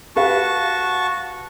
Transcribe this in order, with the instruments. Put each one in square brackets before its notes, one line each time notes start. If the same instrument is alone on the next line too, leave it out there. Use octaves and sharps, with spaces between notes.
[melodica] F#4 A5 C#6 [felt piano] G4 B4 F5